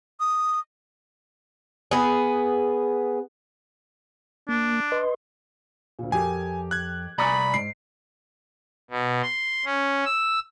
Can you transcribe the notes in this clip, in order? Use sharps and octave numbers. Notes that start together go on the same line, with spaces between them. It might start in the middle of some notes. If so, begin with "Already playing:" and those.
D#6
B3 G#4
A#3 D4
B4 D#5 C6
D2 A#2
F2 G4 A#4 G#5
F#6 G#6
C2 D5 G#5 A#5 B5 C#6 D#6
G#2 C7 D7
B2
C6
C#4
E6